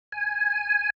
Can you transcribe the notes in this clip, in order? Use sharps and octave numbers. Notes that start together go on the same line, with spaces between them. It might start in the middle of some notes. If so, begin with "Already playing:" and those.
G#5